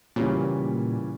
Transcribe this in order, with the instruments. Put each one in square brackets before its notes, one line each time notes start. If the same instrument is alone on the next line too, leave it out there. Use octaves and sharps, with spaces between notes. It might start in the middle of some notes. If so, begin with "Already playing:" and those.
[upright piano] E2 C#3 E3 G3 C#4 [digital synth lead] A#2